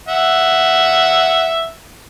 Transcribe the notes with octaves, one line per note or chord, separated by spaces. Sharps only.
E5 F#5